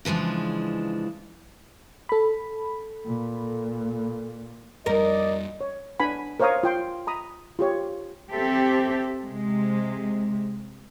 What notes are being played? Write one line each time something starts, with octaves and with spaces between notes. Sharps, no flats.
C#3 E3 F3 G#3 D4
A4 B5
A#2
F2 G3 A#4 D5 D#5
C#5
D4 B4 F#5 G#5 B5
A#4 C5 C#5 F5 A#5 D#6
F4 G5 C6
A#5 B5 D#6
F4 G4 C#5
C4 G4 A4 E5
C3 G#3